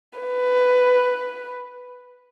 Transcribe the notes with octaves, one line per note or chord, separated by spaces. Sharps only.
B4